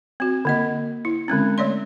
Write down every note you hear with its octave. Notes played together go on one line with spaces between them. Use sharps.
C4 F#4
D3 A#3 D#5
E4
D3 G#3 C4 C#4
A3 C#5 D5 C6